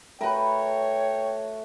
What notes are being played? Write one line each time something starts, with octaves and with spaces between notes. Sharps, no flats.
A3 F#4 A#4 B4 C#5 G5